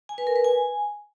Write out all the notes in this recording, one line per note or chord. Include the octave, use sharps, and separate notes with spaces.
G#5
B4
A#4
B4
G#5